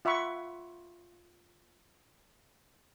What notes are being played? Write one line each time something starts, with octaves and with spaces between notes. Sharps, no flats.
F4 E5 F#5 B5 C#6